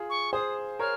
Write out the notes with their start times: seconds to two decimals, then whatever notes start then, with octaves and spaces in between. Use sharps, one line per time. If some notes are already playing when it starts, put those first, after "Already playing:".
Already playing: F4 G#4
0.10 C#6
0.33 G#4 C5 D#6
0.79 A#4 C#5 F6